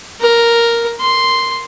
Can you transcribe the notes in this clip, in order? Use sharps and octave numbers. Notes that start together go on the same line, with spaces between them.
A#4
C6